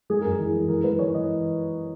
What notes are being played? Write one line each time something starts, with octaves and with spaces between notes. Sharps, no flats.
G#3 G#4
F#2 A#4
G#4
E3
G#3
E3 A#4
G#3 B4
G#3 C#5
E3 D#5